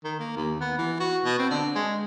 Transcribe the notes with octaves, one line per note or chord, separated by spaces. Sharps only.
D#3
A#3
D#2
B3
E3
F#4
B2
C4
D3
G#3